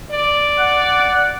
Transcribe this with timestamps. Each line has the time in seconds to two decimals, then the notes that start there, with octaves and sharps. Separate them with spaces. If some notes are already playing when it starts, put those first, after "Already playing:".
0.11 D5
0.59 F#5